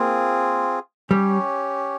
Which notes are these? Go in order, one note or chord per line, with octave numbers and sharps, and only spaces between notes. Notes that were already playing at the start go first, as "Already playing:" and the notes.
Already playing: A#3 C4 F4 G#4
G3 C#4 G4 C#5